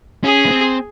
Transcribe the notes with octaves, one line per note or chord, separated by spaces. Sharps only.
C#4 G#4
B3
C4